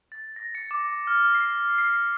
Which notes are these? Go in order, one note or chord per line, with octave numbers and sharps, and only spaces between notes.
A6
A#6
C#7
D6
F6
C7
C7